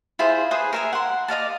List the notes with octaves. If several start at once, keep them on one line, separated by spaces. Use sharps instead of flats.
E4 F4 G#4 C5
G#4 B4 C5 D#6
A#4 E5 G#5
F#5 C6
D5 D#5 F5 A5